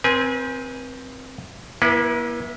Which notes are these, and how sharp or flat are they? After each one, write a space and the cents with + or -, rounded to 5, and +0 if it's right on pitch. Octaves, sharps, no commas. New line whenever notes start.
C4 +0 B4 -45 G#5 +0
A#3 +45 E4 +0 B4 +0